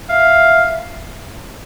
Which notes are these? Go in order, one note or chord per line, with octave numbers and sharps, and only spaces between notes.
E5 F5